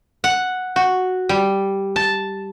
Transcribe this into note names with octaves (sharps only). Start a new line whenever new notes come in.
F#5
F#4
G3
A5